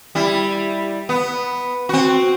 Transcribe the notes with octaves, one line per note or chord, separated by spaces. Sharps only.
G3 E4
B3
C4 F#4